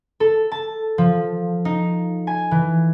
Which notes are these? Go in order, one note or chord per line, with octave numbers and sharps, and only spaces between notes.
A4
A5
F3
D#4
G#5
E3